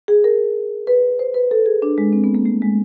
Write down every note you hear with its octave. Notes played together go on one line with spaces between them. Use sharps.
G#4
A#4
B4
C5
B4
A4
G#4
D4
G#3
C4
B3
A#3
A3
G#3